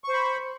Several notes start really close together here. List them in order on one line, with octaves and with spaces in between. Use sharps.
C#6 C5 B5